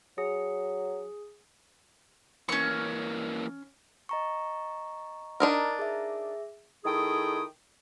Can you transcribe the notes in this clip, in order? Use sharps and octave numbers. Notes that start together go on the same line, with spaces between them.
F#3 G#4
E3 A#3 C#4 C#6
D#5 A#5 C#6
D4 D#4 A#4
G#4 E5
D#3 A3 E4 G#4 G5 D#6